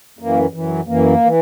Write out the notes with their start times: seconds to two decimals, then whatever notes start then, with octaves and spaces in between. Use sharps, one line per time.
0.19 F#2 E3 A#3
0.53 F#2 E3
0.87 F#2 E3 A#3
1.24 E3